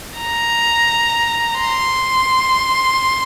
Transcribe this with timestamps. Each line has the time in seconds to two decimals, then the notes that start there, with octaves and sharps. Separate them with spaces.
0.19 A#5
1.59 C6